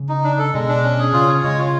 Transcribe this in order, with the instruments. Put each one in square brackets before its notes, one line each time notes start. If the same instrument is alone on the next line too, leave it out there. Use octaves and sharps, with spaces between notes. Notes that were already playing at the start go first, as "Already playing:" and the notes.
Already playing: [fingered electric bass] C#3
[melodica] D#4
D4
A4
[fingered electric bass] B2 [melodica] G#3
[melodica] D4
C#4
G#4
[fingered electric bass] C#3 [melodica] F4
[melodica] C#5
[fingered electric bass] C#3 [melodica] G#3
[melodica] F4